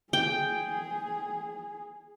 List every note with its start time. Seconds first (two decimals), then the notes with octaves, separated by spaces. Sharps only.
0.13 G#4 G5